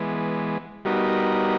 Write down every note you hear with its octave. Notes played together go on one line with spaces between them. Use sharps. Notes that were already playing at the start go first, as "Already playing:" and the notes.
Already playing: E3 G#3 B3
G3 B3 D#4 F#4 A#4